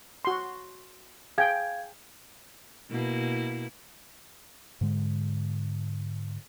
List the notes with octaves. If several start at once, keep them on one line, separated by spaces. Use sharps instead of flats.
F#4 C6
G#4 F5 G5 G#6
B2 A#3 E4
G#2 D3 G#3